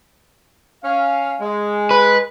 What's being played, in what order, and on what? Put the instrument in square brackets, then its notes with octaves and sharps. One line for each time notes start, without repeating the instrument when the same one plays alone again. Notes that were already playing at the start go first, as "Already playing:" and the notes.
[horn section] C#4 F5
G#3
[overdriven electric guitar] B4